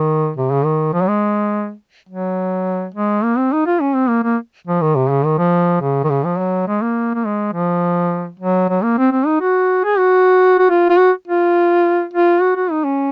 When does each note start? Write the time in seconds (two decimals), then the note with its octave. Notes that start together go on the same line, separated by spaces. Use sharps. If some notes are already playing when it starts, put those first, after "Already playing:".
Already playing: D#3
0.37 C3
0.51 C#3
0.65 D#3
0.93 F3
1.02 F#3
1.08 G#3
2.09 F#3
2.94 G#3
3.24 A#3
3.38 C4
3.53 D#4
3.66 F4
3.81 C#4
3.95 C4
4.09 A#3
4.24 A#3
4.67 F3
4.81 D#3
4.96 C3
5.10 C#3
5.25 D#3
5.38 F3
5.81 C#3
6.04 D#3
6.10 C#3
6.25 F3
6.39 F#3
6.68 G#3
6.82 A#3
7.15 A#3
7.26 G#3
7.54 F3
8.40 F#3
8.69 F#3
8.83 A#3
8.98 C4
9.12 C4
9.26 D#4
9.41 F#4
9.84 G#4
9.98 F#4
10.59 F#4
10.70 F4
10.90 F4
10.98 F#4
11.28 F4
12.14 F4
12.41 F#4
12.56 F#4
12.71 D#4
12.85 C#4